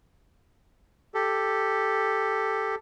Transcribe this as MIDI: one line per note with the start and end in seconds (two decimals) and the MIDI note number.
1.14 2.75 67
1.14 2.75 69